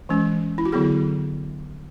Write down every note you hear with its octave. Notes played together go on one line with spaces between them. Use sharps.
E3 G#3 C#4
E4
F#4
D3 F#3 B3 E4 G#4